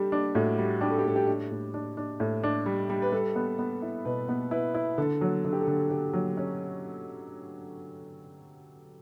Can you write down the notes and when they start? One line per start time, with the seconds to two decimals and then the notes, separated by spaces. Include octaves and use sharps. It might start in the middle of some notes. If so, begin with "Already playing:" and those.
Already playing: G3 D4 G4 A4
0.12 D4
0.35 A2 F#4
0.58 G3
0.81 D4 G4
0.90 A4
0.98 G4
1.05 A2 A4
1.16 G4
1.27 D4
1.51 A2
1.74 D4
1.97 D4
2.20 A2
2.44 D4
2.66 G3
2.90 G3
3.02 B4
3.12 G3 A4
3.36 B3
3.59 B3
3.82 E4
4.05 B2 B4
4.29 B3
4.51 E4 B4
4.75 E4
4.98 D3 A4
5.21 F#3
5.44 D3 A4
5.53 G4
5.60 A4
5.67 D3
5.90 D3 G4
6.13 F#3
6.37 C#4